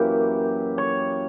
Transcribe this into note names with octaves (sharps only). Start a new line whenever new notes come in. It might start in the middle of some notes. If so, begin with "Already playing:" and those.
Already playing: F#2 E3 A#3 G4
C#5